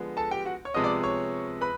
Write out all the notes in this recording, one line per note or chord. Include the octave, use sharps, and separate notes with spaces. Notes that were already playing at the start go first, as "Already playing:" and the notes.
Already playing: D3 F3 G#3 B3
A4 A5
G4 G5
F#4 F#5
C#5 C#6
C3 F3 G#3 B3 D#5 D#6
D5 D6
C#5 C#6
B4 B5